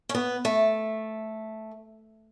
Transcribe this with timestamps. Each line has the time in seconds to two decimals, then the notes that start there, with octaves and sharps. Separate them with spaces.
0.09 C#4
0.15 B3
0.45 A3